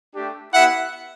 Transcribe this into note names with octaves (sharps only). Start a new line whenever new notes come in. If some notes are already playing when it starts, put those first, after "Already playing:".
A3 D4 G4
B3 E4 G4 E5 F#5